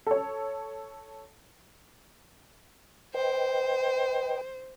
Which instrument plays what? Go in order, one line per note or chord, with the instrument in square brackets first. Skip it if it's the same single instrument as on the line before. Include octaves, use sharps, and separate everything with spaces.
[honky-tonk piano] A4 C#5
[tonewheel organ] B4 D#5 G5 [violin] C5